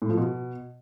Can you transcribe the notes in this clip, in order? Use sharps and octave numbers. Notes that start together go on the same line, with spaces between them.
A2
F3
B2